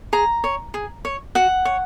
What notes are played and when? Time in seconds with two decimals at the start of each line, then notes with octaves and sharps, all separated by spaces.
0.13 G#4 A#5
0.44 C#5
0.74 G#4
1.05 C#5
1.35 F#4 F#5
1.65 C#5